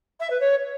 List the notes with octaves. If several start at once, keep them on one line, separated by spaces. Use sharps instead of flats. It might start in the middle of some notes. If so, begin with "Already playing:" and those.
E5
B4
C#5